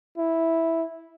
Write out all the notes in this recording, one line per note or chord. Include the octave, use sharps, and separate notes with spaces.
E4